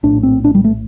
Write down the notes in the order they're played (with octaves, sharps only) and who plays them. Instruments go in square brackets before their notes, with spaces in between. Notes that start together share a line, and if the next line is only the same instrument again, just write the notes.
[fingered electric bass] A#1 A2 D4
C4
D4
G3
A3